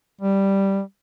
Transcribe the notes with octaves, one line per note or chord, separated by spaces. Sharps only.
G3